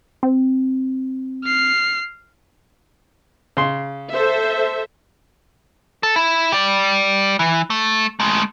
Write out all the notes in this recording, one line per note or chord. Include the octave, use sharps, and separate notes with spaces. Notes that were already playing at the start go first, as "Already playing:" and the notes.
C4
F6 C7
C#3 C6
A4 C5 E5
A4
E4
G4 D5
E3
A3
G#3 A3